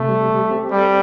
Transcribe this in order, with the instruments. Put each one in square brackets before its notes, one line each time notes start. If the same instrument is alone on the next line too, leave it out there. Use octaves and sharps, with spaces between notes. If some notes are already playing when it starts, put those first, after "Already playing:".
Already playing: [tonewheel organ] C3 [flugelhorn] A3
[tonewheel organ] G3
G4
C4
[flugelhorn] G3 [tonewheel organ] A4